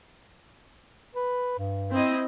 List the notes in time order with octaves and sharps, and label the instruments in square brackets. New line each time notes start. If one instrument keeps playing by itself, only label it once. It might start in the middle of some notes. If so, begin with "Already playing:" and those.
[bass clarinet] B4
G2
[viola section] C4 E4 D#5